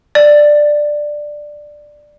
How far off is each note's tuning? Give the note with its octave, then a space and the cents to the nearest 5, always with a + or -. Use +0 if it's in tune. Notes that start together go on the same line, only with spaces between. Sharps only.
D5 +10